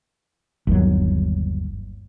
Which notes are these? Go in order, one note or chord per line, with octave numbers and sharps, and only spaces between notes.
G1 D#2 F#3